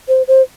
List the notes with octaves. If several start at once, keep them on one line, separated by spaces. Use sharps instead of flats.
C5
C5